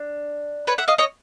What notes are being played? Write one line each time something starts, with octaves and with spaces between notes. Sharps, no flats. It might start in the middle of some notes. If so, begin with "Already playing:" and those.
Already playing: D4
B4 C#5
E5 F#5
D#5 F5
C#5 D#5